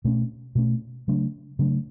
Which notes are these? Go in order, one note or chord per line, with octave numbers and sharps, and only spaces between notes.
B2 A3 C#4
B2 A3 C#4
C#3 F#3 A3 D4
C#3 F#3 A3 D4